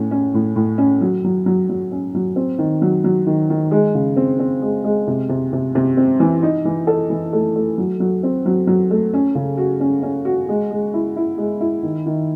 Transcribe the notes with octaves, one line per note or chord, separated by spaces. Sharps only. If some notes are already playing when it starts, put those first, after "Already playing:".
Already playing: A2 C#4
C#4
A2
A2
C#4
F#3
F#3
F#3
F#3
C#4
F#3
C4
D#3
F#3
F#3
D#3
D#3
G#3
C#3
C4
C4
G#3
G#3
C3
C3
C3
C3
C4
E3
D#4
E3
A4
E3
A3
A3
F#3
F#3
C4
F#3
F#3
A3
C#4
C#3
F#4
C#4
C#4
F#4
G#3
G#3
E4
E4
G#3
E4
D#3
D#3